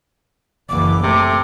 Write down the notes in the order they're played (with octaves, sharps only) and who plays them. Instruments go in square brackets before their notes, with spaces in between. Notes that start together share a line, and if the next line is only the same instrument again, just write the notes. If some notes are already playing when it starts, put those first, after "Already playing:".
[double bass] F#1 E3 [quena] D6
[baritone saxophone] C3 [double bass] A3